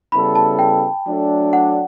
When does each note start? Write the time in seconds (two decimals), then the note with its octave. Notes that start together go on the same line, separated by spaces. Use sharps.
0.12 C#3 G3 B3 E4 A4 B5
0.35 A5
0.59 G5
1.06 F#3 A3 D4 A4
1.53 F#5